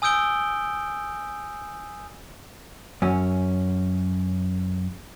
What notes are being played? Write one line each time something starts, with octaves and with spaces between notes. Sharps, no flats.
G#5 D#6 E6 G6 D7 G7
F#2 C#4